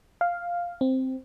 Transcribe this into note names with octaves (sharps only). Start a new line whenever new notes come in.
F5
C4